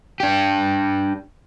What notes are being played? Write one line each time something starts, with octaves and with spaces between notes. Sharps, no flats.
D4 G4